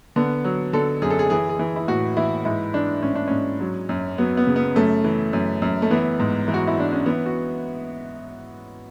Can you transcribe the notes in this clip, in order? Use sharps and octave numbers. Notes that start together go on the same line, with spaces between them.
D3 B3
F#3
D3 A4
F#2 G#4
A4
G#4
E3 G#4
G#4
E3
E4
A2 F#4
E3 E4
G#2 E4
E3 D4
G#2 C#4
D4
G#2 C#4
F#3
F#2
F#3 B3
B3
C#3
B3
F#2 A3
E3
F#2
F#2
A3
E3 B3
G#2
E3
F#4
E4
E3 D4
C#4
E3 B3
F#4